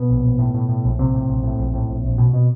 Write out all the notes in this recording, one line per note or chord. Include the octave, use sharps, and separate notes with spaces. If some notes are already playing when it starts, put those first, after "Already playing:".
Already playing: B2 B3
A#1
A#1
A2
A2
A2
A#1
A#1 C3 C4
A2
A#1
A2
A#1
A2
A#1
A#1
B2
B2